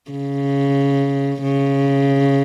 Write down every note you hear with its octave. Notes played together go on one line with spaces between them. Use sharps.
C#3
C#3